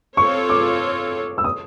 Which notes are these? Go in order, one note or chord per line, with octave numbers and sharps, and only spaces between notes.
C4 F4 A4 C#5 C#6
D6
E6
D#6